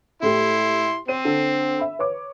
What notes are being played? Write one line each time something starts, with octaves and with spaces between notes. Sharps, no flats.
A2 A3 E4 G4 C6
C4 C5 D#7
D3 A4
E5 B5
B4 C#5 D6